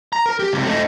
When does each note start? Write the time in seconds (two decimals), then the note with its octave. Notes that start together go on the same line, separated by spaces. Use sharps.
0.13 A#5
0.26 A#4
0.39 G4
0.53 C#2 C3
0.65 A3 D#4